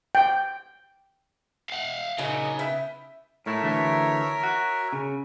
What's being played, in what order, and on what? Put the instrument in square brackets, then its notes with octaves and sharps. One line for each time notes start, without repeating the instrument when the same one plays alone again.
[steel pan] G5
[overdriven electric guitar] F5 F#5
[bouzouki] A#2 F#3 D#4 [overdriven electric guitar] C#3
[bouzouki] B3 E4 G5
[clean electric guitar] A2 A3 E4 [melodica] A#4 C#5 E5
[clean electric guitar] D2 E3 A3
F#4
C#3